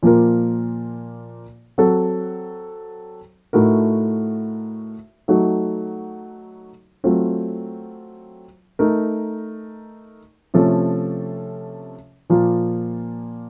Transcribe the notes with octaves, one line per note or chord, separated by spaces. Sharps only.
A#2 F3 A#3 F4 A#4
F#3 C4 F#4 A4
A2 A3 D#4 F#4 A#4
F#3 A3 D#4 F#4
F#3 A3 C4 F4
A3 D#4 A#4
C3 F3 A3 C#4 A4
A#2 F3 A#3 F4